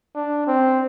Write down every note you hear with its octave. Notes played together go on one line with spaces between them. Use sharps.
D4
C4